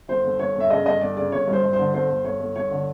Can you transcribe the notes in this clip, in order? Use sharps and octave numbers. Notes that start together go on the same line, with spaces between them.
G1 C5
G1
G1 C#5
G1
E5
C#3 D#5
G1 D#5
G1 D5
C#3 D5
G1 C#5
G2
C5
G2
C5
D3
G1 C5
G1
G1 C#5
G1
G1 C#5
D3